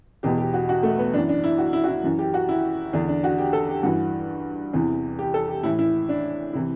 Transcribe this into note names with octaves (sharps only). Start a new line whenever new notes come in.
E2 B2 G4
G4
F#4
F#4
A3
B3
F#2 E3 D4
D4
E4
F#4
E4
F#4
E4
F#2 E3
G4
F#4
E4
E2 D3 D4
D4
F#4
G4
A4
G4
G2 E3 F#4
E2 C3 E3
G4
A4
G4
A2 E3 E4
E4
D4
C3 E3 E4